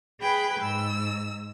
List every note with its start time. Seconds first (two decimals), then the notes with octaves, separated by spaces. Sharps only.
0.21 G#4 B4 G5 B5
0.61 G#2 E6